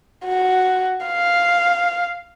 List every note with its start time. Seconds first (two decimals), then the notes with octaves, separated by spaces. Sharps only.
0.25 F#4
1.06 F5